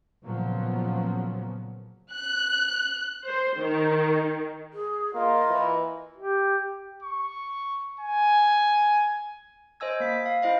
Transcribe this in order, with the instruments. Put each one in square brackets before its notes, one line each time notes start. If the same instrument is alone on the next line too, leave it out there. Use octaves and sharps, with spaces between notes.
[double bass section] A#2 C#3 F3 F#3 B3
[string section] F#6
C5
D#3
[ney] G#4
[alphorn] A#3 [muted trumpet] F4 [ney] D#5
[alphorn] E3
[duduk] G4
[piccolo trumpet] C#6
G#5
[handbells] C5 D#5 G#5 E6 G#6
A#3 B6
F5
E4 C5 D#5 F5